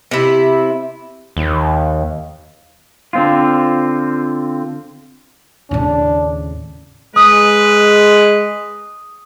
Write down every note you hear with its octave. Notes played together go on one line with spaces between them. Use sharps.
C3 E4
D#2
D3 C4 F4
D#2 A2 C#3 C#4 D4
G#3 B4 D#6